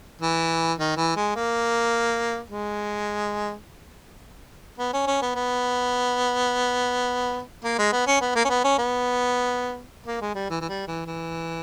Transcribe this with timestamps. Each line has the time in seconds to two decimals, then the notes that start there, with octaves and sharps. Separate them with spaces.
0.22 E3
0.79 D#3
0.97 E3
1.16 G#3
1.36 A#3
2.50 G#3
4.78 B3
4.93 C#4
5.07 C#4
5.22 B3
5.35 B3
7.64 A#3
7.78 G#3
7.92 B3
8.07 C#4
8.21 B3
8.35 A#3
8.45 C#4
8.50 B3
8.64 C#4
8.79 B3
10.07 A#3
10.22 G#3
10.35 G3
10.50 E3
10.61 E3
10.69 G3
10.88 E3
11.07 E3